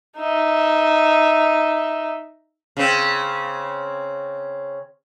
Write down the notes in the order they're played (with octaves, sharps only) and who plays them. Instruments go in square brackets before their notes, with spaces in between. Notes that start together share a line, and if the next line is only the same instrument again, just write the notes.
[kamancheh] D#4 E5
[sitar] C#3 C4